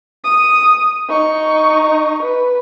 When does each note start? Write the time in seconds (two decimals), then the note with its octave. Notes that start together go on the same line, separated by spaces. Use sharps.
0.25 D#6
1.08 D#4 C#6
2.22 B4